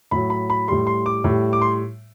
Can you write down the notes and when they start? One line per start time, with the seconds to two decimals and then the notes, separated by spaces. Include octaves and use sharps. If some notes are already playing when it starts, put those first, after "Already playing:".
0.11 A2 F#3 B5
0.30 B5
0.50 B5
0.68 A2 G3 C6
0.87 C6
1.06 D6
1.24 A2 G3
1.53 D6
1.61 C6